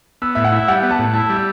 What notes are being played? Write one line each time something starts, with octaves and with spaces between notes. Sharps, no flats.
B3 E6
A2 E5
F#5
E4
G3 F#5
B3
A5
A2
E4 A5
G3
E6